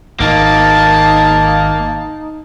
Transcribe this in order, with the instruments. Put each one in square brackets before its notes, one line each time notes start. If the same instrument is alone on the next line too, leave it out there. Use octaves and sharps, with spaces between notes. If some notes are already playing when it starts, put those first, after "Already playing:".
[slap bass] G#1 [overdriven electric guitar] A#3 [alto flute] D#4 [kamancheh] A5